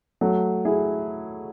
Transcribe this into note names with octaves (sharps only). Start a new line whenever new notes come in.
F#3 A3
E4 G#4